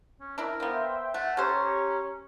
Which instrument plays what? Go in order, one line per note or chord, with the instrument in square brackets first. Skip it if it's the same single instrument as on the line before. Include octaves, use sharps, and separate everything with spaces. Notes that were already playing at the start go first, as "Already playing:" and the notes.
[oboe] C#4
[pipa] D4 E4 [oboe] A#4
[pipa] A#3 B3 [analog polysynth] C5 E5 G5
[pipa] A3 [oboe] F#5
[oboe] C#4 [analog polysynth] G4 C#5 A#5 [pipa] A4 C5